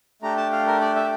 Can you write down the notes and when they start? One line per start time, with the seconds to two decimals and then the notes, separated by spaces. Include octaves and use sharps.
0.22 A3 D4 G4 A#5
0.37 A5
0.52 F5
0.67 A#4
0.81 D5
0.96 E5